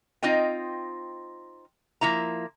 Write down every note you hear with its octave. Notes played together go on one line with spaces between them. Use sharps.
C4 D#4 F4 D#5 G5
F3 A#3 E4 A#5